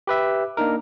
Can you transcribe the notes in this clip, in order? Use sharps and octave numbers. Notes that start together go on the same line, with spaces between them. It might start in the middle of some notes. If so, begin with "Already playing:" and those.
G4 B4 E5
A#3 D4 D#4 A#4